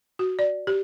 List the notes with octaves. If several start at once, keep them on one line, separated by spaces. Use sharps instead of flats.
F#4
D5
G4